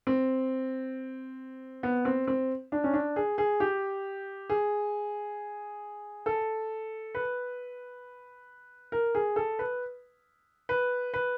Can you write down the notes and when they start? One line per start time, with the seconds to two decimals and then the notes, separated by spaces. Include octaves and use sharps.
0.07 C4
1.83 B3
2.05 C4
2.27 C4
2.72 D4
2.84 C#4
2.93 D4
3.16 G#4
3.38 G#4
3.60 G4
4.50 G#4
6.26 A4
7.15 B4
8.92 A#4
9.15 G#4
9.36 A4
9.59 B4
10.69 B4
11.14 B4